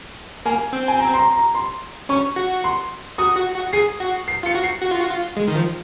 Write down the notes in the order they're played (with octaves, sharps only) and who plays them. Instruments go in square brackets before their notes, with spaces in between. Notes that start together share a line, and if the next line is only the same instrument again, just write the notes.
[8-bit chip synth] A#3 [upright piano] G#5
[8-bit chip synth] C4
[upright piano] G#5
A#5
C6
A#5
A#5
C6
[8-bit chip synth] C#4 [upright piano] C#6
[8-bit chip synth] F#4
[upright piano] C6
[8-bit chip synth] F#4 [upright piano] D#6
[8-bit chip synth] F#4
F#4
[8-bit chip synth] G#4 [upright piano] C7
[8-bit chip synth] F#4
[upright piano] C7
[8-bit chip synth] F4 [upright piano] C#7
[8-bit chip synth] F#4
[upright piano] C7
[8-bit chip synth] F#4
F4
F#4
F4
G#3
D#3
F3